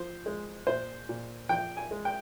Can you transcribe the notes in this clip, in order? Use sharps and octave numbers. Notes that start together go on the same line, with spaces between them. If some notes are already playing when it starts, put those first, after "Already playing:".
Already playing: F3 C5
G#3
A#2 C5
A#2
F3 G5
G#5
G#3
G5